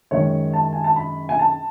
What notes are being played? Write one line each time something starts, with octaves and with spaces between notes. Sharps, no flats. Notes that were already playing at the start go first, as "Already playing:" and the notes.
F#2 D#3 G#3 C#5
A5
G#5
A5
B5
G#5
A5